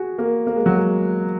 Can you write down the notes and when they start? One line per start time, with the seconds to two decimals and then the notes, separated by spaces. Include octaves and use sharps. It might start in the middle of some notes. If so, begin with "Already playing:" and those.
Already playing: F#4 G#4
0.18 A#3
0.47 A#3
0.56 G#3
0.66 F#3
0.76 G#3